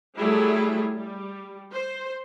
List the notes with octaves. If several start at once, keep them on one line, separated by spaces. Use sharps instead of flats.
F#3 G3 A3 E4 G#4
G3
C5